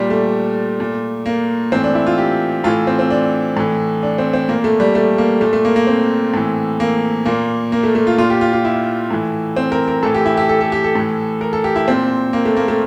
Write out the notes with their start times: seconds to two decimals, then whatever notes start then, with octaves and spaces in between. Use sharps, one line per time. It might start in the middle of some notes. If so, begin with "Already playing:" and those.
Already playing: A#2 G3
0.10 A3
0.80 A#2
1.26 A#3
1.72 A2 E3 C4
1.84 D4
1.95 E4
2.07 F4
2.18 G4
2.64 A2 E3 F4
2.87 C4
2.99 C4
3.11 D4
3.57 A2 E3
4.03 D4
4.18 C4
4.33 C4
4.49 A#2 A#3
4.64 A3
4.80 G3
4.95 A3
5.18 A#3
5.41 A#2 A3
5.53 A3
5.65 A#3
5.76 A#3
5.87 C4
6.34 A2 E3
6.80 A#3
7.25 A#2 A#3
7.72 A#3
7.83 A3
7.95 A3
8.07 F4
8.18 A#2 F4
8.30 G4
8.41 F4
8.53 F4
8.65 E4
9.10 A2 E3
9.56 C4
9.72 A#4
9.88 A#4
10.03 A2 E3 A4
10.14 G4
10.26 E4
10.37 G4
10.49 A4
10.61 A4
10.72 G4
10.84 A4
10.95 A2 E3
11.41 A#4
11.53 A4
11.64 G4
11.76 E4
11.88 A#2 C4
12.33 A#3
12.45 A3
12.57 A#3
12.68 A3